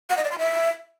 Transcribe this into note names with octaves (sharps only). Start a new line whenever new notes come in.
F#5
D#5
D5
C6
E5